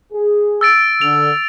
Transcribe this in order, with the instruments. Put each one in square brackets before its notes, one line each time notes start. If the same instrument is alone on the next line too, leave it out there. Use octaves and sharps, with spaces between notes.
[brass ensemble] G#4
[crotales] E6 A6 D7
[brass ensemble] D3 [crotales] F7